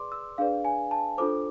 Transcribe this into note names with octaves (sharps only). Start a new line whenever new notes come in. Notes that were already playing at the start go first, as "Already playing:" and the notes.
Already playing: G#4 B4 D5 C6 D6
E6
D4 G#4 B4 D5 F5
G#5
A5
D4 F4 A4 C5 D6